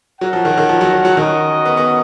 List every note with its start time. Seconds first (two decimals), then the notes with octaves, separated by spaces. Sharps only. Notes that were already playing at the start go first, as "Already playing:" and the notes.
0.21 F#3 F#4 A#4 C#5 F#5
0.33 F3
0.45 D#3
0.58 D#3
0.69 F3
0.81 F#3
0.93 F#3
1.05 F#3
1.17 D#3 C#4 F#4 A#4 D#5 F#5
1.65 B3
1.77 B3